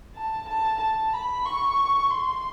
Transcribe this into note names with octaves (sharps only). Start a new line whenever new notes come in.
A5
A5
A5
B5
C#6
C6